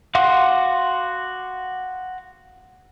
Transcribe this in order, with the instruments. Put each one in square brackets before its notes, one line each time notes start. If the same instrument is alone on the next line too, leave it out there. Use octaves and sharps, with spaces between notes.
[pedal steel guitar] F#4 F5 F#5 C6 D6